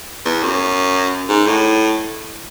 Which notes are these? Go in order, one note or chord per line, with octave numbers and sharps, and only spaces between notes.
E2
F#2
G#2
A2